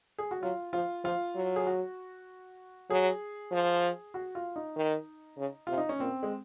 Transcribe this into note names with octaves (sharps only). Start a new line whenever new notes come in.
G#4
F#4
F#3 F4
F3 F4
F3 F4
F#3
G#4
F#4
F#3 G#4
F3
F#4
F4
D#4
D#3
C#3
C3 F4
D#4
C#4
A#2 C4
G#3